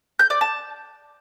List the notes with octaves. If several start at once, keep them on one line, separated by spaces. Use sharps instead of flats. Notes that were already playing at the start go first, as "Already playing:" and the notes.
G6
D5
A5